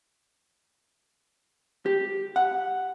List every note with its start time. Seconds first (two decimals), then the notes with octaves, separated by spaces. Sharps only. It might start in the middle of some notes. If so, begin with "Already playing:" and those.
1.86 G4
2.36 F#5